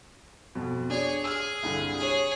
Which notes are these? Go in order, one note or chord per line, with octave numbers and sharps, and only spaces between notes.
F2 B2
D4 G#4 C#5
G#4 E6 F6
C2 G2 D3
G#4 C#5